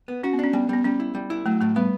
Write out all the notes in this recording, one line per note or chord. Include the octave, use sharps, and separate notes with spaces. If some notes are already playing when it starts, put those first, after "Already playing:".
B3
C#4 F#4
B3
C#4 D4
G3 B3
G3 B3
G3 C#4
E4
G3
E4
F#3 A3
A2 A3
G3 B3